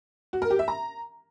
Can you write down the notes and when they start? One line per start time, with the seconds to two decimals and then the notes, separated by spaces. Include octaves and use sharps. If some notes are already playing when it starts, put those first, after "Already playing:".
0.33 F#4
0.42 A#4
0.50 G4
0.59 E5
0.68 A#5